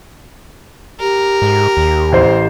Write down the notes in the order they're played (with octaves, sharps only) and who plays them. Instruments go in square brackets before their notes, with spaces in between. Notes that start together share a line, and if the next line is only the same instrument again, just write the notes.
[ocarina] G4 [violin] A#4
[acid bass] G#2
D#2
[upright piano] A1 C5